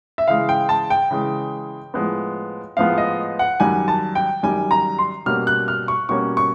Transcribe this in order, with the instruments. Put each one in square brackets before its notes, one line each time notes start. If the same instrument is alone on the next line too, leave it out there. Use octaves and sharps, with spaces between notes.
[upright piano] E5
C#3 E3 G#3 F5
G5
A5
G5
C#3 E3 G#3
A2 F3 G#3 B3
A2 F3 G#3 B3 F5
D#5
F#5
F#2 D#3 G3 G#5
A5
G5
F#2 D#3 G3 G#5
A#5
C6
B2 G3 A#3 C#4 F6
F#6
F6
C#6
B2 G3 A#3 C#4 C#6
C#6